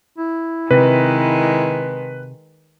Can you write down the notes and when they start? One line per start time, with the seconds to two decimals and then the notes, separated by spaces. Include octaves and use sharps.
0.18 E4
0.71 C3 D#3 G#3 B4